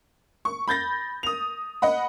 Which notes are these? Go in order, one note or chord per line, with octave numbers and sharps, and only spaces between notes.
C#6
B5 G6 A6 A#6
D#6 F7
D#5 F#5 B5